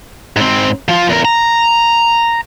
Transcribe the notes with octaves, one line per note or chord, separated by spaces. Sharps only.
G#2 C4
F3 F4
E2 A#4
A#5